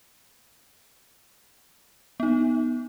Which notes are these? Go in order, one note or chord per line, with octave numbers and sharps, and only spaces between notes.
B3 D#4